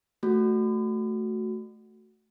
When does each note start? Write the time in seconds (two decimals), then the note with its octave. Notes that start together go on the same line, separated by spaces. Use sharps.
0.23 A3 F#4